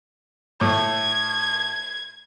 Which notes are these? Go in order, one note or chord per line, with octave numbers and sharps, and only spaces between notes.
A2 G#6